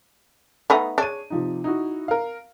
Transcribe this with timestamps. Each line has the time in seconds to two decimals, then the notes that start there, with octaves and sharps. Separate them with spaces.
0.70 A3 B3 D#4
0.98 D4 G#4 C#5 D#7
1.30 C3 F3 D#4
1.64 D#4 E4 F#4
2.08 A#4 F5